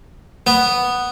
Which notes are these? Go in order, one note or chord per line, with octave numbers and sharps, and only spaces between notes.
B3